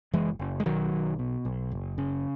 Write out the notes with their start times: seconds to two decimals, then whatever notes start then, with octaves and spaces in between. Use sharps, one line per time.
0.13 F#1 E3 G#3
0.39 F#1
0.60 G#3
0.66 B1 D#3 F#3
0.92 B1
1.19 B2
1.45 B1
1.71 F#1
1.98 C#3